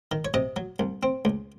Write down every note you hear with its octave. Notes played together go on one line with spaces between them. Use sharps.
D#3
C#5
C3 D#5
F#3
C2
C4
C#2